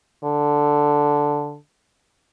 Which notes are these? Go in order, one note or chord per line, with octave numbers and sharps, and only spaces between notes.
D3